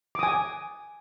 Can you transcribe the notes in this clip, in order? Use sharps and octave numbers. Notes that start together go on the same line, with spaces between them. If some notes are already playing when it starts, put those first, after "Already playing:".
G#5 D6 D#6